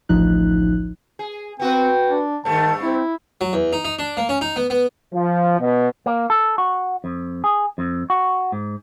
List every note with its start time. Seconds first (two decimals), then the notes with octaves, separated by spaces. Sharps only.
0.09 A1 D2 F3 D#4 F#6
1.19 G#4
1.60 B3 C4 F#4 B4 G5
2.08 D4
2.45 G2 D#3 A3 A5
2.82 C4 E4
3.41 F#3
3.53 E2
3.73 D#4
3.85 D#4
3.99 D4
4.17 A#3
4.29 C#4
4.41 D#4
4.56 B3
4.70 B3
5.13 F3
5.59 B2
6.06 A#3
6.30 A4
6.58 F#4
7.04 F2
7.44 G#4
7.78 F2
8.10 F#4
8.52 G#2